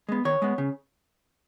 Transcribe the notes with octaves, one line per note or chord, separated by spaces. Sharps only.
G#3 B3
D#3 C#5
G#3 B3
C#3